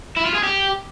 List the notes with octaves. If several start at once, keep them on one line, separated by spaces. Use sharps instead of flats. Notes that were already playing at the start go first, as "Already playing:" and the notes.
E4
F4
G#4
G4